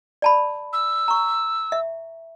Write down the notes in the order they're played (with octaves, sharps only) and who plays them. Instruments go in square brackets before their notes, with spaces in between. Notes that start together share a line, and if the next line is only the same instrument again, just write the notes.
[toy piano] D5 A5 B5
[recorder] E6
[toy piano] A#5 C#6
E5